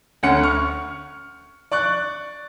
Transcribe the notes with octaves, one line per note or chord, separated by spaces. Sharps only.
D2 C#4 F#5 C#7
C#6 F6
D5 C#6 F#6